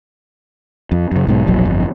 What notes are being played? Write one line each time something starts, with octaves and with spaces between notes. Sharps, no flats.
F2
F#2 C#3
B1 G#2 B2
E1 A#1 F#3
G1 F2